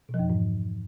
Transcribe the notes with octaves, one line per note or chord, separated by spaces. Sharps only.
B2
F3
F2
E3
G#2